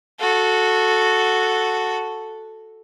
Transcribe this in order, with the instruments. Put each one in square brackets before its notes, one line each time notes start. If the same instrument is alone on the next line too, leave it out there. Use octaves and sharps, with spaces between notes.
[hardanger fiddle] F#4 A4